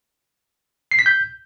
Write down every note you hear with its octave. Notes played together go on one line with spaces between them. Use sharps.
C7
B6
G6